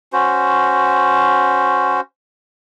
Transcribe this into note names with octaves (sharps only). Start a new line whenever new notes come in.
C#4 F#4 C5